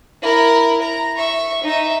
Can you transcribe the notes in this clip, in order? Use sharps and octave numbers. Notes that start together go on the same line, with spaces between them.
E4 A#4
A#5
E5 C#6
D#4 E5